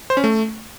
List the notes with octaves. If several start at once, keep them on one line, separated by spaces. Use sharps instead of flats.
C5
C#4
A3